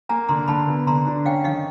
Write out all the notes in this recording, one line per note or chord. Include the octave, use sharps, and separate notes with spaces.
A#3 G#5 A#5
D3 A#5 C6
D3 A5 B5
B3
D3 A#5 C6
D4
C#4 F5 G5
D#3 D#5 F5